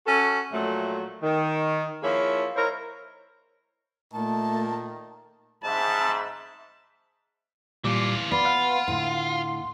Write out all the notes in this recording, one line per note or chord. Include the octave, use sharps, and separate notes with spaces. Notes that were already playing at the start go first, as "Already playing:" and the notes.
C#4 F#4 A4
A#2 F3 F#3 A3
D#3
F3 A#3 E4 G#4 C#5
D#4 E4 A#4 C5 C#5
A#2 D#3 A3 A5
G#2 E5 A5 B5
A#2 E3 G3 F4 D6
B3 F4 B4 D5 B5
F5 F#5
A2 D3 C6